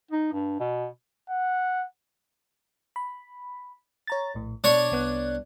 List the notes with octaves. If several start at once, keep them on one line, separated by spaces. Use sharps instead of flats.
D#4
G2
B2
F#5
B5
C#5 A#5 A6
A#1 A2
B2 D4 C#5
C2 B3 F#6